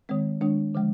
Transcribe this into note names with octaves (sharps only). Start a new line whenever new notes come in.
D#3 G#3 C4
D#3 G#3 D4
D3 F3 G#3